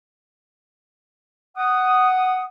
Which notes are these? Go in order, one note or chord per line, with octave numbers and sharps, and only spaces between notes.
F#5 D#6